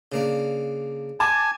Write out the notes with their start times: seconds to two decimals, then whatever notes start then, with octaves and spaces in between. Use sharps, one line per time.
0.12 C#3 A#3 D4
1.20 G#5 A5 D6